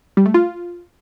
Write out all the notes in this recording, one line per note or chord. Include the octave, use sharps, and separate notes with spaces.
G3
A3
F4